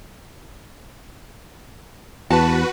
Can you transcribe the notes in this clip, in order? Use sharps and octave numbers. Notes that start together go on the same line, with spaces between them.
E2 F#4 B4 A5